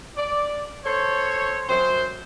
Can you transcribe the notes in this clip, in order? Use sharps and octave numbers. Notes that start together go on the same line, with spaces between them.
D5
A4 C5 C#5
F#2 C5